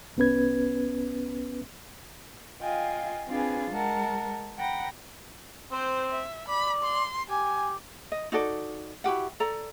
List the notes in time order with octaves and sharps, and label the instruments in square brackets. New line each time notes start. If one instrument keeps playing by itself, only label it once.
[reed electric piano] C2 B3 C#4 B4 G#6
[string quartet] F4 D#5 F5 G5 G#5
C4 D4 F4 G#4 B4 G#5
G#3 A#4 F#5 A5
F#5 G5 A#5 B5 A#6
[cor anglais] C4 [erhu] C5
[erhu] E5
[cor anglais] D5 [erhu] B5
[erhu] C6
[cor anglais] G4 [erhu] G#5
[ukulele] D#5
D#4 F#4 A4 D5
E4 F#4 G4 F#5
A4 D5 A#5